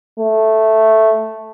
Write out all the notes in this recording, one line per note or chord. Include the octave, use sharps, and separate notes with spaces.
A3